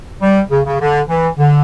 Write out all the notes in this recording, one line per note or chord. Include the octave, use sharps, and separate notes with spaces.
G3
C#3
C#3
D3
E3
D3